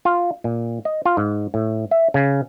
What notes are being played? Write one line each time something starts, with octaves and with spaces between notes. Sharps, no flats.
F4
A#2
D#5
F4
G#2
A2
E5
C#3